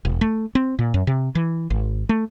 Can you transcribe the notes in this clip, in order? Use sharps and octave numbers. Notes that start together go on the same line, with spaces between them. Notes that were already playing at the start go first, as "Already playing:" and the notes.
E1
A3
C4
A#2
F#2
C3
E3
G#1
A3